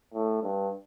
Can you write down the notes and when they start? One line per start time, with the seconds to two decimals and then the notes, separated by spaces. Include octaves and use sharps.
0.14 A2
0.43 G2